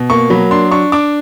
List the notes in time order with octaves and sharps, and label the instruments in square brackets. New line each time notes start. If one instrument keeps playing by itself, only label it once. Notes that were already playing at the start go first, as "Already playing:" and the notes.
Already playing: [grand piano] B2
A#3 C#6
F#3 B5
D4 C6
D4 C#6
D4 D6